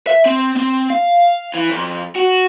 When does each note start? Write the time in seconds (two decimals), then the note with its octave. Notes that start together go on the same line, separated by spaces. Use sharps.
0.07 E5
0.26 C4
0.57 C4
0.90 F5
1.55 E3
1.70 F2
2.16 F#4